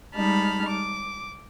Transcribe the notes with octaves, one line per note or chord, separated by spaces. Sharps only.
G3 G#3 D#4 A5 B5 F6
D6